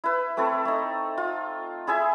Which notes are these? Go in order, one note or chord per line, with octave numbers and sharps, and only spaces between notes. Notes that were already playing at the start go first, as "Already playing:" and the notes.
E4 B4
A3 C4 E4 A4
A3 D#4
F4
E4 G#4 E5 G#5